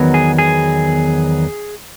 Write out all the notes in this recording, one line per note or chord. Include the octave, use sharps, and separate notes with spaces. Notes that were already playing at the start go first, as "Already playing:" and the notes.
Already playing: E2 D#3 F#3 B3
G#4
G#4